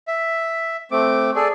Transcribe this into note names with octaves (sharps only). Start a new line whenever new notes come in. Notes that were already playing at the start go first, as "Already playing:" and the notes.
E5
A3 C4 D6
G#4 A4 D5